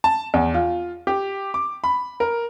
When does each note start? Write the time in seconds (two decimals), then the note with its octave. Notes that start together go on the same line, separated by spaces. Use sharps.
0.04 A5
0.34 E2
0.54 F4
1.07 G4
1.54 D6
1.84 B5
2.20 A#4